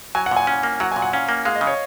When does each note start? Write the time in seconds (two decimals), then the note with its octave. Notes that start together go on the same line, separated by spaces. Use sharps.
0.15 F#3 G#5
0.26 F#5
0.31 A#2
0.37 G#5
0.47 C#4 F#5
0.63 A#3
0.80 F#3 F#5
0.92 G#5
0.96 A#2
1.02 F#5
1.13 C#4 F5
1.29 A#3
1.45 G#3 F5
1.56 D#5
1.61 C#3
1.67 C#5